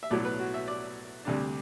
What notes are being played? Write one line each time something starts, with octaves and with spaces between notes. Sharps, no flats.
E5
B1 A2 F#3 D5
B4
F#4
E5
D5
D2 C3 G3 D4